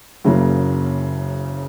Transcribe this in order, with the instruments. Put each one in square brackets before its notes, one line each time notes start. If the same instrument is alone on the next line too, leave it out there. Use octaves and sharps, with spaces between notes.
[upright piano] F#1 F#2 C#3 F#3 A#3